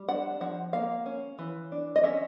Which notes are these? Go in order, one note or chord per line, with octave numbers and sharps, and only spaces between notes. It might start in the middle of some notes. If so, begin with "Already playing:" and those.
Already playing: G3
D4 F#5
F3 F#5
A#3 F5
C#4
E3
D4
D#5
C#4 E5